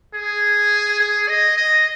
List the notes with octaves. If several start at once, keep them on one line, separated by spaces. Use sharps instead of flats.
G#4
G#4
D#5
D#5